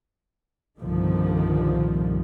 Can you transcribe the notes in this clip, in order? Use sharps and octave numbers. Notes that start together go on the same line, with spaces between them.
C2 G2 A#2 D3 D#3 F3